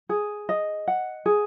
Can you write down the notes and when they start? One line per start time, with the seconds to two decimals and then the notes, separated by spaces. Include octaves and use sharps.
0.09 G#4
0.49 D#5
0.88 F#5
1.26 G#4